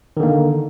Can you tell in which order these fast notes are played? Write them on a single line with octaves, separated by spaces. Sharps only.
D#3 D3 A#3